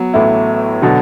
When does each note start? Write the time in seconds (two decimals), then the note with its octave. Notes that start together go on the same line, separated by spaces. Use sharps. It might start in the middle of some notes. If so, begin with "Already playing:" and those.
Already playing: F#3 B3
0.14 A1 A2 A3 E4
0.82 B2 D3 F#3